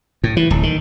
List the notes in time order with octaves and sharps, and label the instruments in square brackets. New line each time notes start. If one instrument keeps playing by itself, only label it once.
[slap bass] A2
E3
D1
D#3